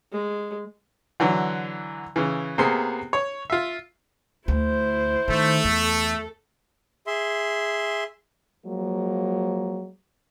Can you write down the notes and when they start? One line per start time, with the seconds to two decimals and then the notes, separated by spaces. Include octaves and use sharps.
0.12 G#3
1.20 D3 E3 F#3
2.16 C#3 E3
2.58 C3 A#3 B3 G#4 C5 C6
3.13 C#5
3.50 F4 E5
4.48 D2 E4 C5
5.28 D#3 A3
5.64 E2 A4
7.07 G#4 E5 C6
8.66 F3 F#3 G#3 A#3